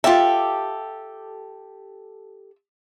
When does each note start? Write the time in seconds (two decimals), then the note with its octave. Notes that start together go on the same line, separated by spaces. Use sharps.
0.04 F4 G4 A4 E5